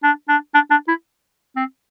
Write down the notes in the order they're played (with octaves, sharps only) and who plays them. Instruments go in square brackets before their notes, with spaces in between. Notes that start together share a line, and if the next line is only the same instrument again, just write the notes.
[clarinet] D4
D4
D4
D4
E4
C4